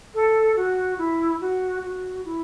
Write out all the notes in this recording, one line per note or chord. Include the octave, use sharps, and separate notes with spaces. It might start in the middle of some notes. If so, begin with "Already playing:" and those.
A4
F#4
E4
F#4
F#4
E4